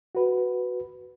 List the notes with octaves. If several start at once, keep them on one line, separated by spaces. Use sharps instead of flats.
F#4 B4